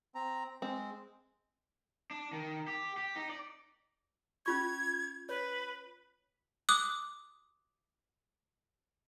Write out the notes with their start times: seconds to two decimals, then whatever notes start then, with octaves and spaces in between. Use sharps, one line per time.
0.15 C4 A#5
0.62 G#3 C4
2.11 D4
2.33 D#3
2.68 G4
2.97 G4
3.16 D#4
3.29 D5
4.46 C#4 F4 C#6 G#6
5.29 B4 C#5
6.69 D6 D#6 F#6